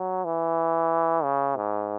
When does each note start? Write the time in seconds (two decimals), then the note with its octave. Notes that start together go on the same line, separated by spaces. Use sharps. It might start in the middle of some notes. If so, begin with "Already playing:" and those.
Already playing: F#3
0.25 E3
1.23 C#3
1.56 G#2